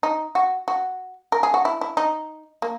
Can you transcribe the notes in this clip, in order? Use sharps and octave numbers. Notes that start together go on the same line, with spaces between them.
D#4
F#4
F#4
A#4
G#4
F#4
E4
E4
D#4
A#3